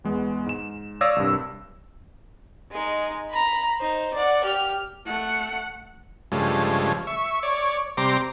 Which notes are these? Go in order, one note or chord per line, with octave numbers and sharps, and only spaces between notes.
E2 G#3 B3
G#2 E7
C#5 D5 F5 D#6 E6 A#6
C2 G2
G#3 D#4
A#5 B5
D#4 C5
D5 F#5
G4 F6
A3 F#5
G2 C#3 F3 G#3 A3
E5 C#6
C#5 D5
C3 G3 A#5 C6 D6